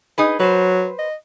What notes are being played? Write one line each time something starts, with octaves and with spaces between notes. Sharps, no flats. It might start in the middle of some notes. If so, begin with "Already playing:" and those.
D#4 G#4 B4
F#3 B4 C5
D#5